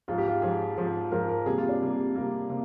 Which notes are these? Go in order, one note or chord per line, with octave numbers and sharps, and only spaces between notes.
G#2 F3 G#3 F4
G4
F4
G#2 F3 G#3 G#4
G#2 F3 G#3
G#2 F3 G#3 A#4
A#4
C3 G3 A#3 G#4
F4
D4
C3 G3 A#3
C3 G3 A#3
C3 A#3